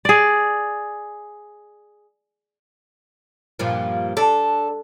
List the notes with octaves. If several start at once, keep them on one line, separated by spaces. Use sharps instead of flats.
G#4 D5
G2 A#2 F3
D4 A4